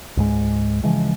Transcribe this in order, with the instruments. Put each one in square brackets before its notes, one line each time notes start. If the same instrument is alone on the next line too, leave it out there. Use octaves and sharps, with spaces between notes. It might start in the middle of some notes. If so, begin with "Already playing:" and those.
[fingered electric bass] C#2 G#2 G#3
C#3 E3 F3 G#3